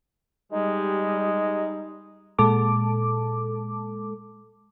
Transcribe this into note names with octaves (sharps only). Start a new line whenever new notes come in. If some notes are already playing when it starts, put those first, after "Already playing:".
G3 G#3 D#4
A#2 G#3 A4 A5 D6